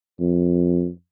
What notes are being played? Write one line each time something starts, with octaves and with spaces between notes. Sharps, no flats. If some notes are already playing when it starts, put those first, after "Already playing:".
F2